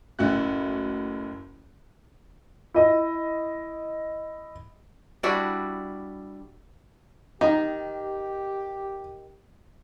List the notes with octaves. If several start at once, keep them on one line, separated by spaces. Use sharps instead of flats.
F#1 A2 E4 F#4 F#6
E4 D#5
G3 D4 E4 F#4
D#3 D#4 G4